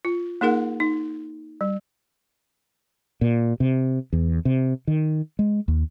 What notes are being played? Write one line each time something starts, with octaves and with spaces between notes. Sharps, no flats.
F4
A#3 D#4 G#4 A#4 F#5
D#4
G3
A#2
C3
E2
C3
D#3
G#3
D#2